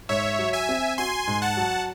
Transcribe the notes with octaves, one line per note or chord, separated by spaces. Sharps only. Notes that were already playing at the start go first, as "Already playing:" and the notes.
G#2 C#5 E5
F#3
E5 G#5
C4
F#4 G#5 C6
G#2
F#5 A5
F#3